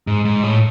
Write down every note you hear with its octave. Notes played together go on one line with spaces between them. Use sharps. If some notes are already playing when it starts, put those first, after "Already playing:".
G#2
G#2
A2